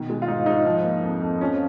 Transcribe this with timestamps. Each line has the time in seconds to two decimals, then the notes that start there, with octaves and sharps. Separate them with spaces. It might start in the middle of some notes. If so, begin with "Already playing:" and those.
Already playing: B2 D#3
0.10 G#3
0.22 F4
0.27 G#2 D#4
0.46 G#2 D#4
0.65 F3
0.84 A#3
1.03 F2
1.21 F2
1.41 F3 C#4